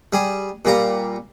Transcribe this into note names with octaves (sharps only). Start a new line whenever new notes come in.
G3 G#4
A#2 G3 A#5